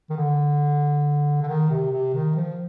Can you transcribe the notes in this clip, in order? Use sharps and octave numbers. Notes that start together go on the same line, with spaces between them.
D#3
D3
D3
D#3
C3
C3
D#3
F3